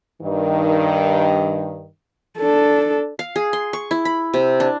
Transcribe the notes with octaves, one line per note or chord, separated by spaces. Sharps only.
G2 D#3
D4 A4
F5
G#4
C6
C#6
E4
B5
C3
D4